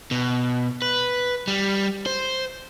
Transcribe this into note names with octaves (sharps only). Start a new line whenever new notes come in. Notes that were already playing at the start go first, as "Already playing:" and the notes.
B2
B4
G3
C5